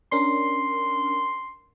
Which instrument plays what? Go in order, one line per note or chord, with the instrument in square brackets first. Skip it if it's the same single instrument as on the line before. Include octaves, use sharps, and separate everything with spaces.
[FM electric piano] C#4 D4 A#4 [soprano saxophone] C6